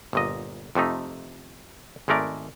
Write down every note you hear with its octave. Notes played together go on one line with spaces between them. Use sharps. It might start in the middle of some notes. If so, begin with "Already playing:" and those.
G1 A#2 D#5
F2 C3 A3 D#4
G#1 G#3 A3 A#4 D5